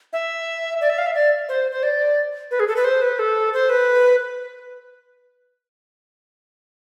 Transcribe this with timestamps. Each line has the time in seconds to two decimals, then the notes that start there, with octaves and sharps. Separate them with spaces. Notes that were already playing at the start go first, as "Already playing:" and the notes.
0.13 E5
0.81 D5
0.90 E5
0.98 F5
1.06 E5
1.14 D5
1.49 C5
1.71 C5
1.83 D5
2.51 B4
2.60 G#4
2.68 A4
2.76 B4
2.84 C5
3.02 B4
3.19 A4
3.54 C5
3.69 B4